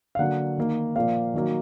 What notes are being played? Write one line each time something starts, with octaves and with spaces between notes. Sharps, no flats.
F5
D3 F#3 A#3 F#5
D#3 A#3
A#2 F3 A#3 F5
D#3 F#3 A#3